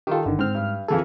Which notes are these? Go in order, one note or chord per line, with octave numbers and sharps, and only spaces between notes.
D#3 F4 G4 A4
G1 D3 D#3
G#2 C4 F6
G2
F2 E3 G#4 A4